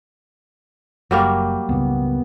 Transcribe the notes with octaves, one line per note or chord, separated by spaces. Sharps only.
F#1 F#3 G3 A#3
C#2 G2 C#3 B3